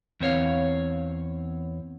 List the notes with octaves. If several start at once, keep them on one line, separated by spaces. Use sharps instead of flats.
E2 C4 C#5 F5